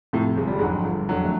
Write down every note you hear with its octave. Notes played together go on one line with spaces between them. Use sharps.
A2 C3 F3 A3
G1 G#3
G3
F2 G#2 D3 F#3 G#3
G1
F2 D3 F#3
A3